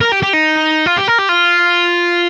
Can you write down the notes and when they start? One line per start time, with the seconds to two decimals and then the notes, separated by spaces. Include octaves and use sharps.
0.01 A#4
0.12 G4
0.23 G4
0.33 D#4
0.86 F4
0.97 G4
1.08 A#4
1.18 G4
1.29 F4